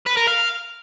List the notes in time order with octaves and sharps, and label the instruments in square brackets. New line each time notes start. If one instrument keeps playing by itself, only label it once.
[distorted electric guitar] B4
A#4
F5